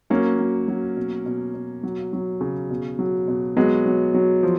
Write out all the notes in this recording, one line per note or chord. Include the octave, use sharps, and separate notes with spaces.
F#3 A#3 C#4
F#3
F#3
B2
B2
B2
F#3
F#3
C#3
B2
F#3
B2
F#3 G#3 B3
F#3
F#3
F3